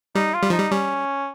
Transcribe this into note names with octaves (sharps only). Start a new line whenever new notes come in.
G3 D#4
F4
G3
F3 D#4
G3
G3 C#4